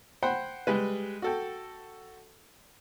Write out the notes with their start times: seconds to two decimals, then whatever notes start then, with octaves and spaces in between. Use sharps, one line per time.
0.23 C5 F#5 G5 B5
0.67 G3 G#3 B4
1.22 F#4 A4 G5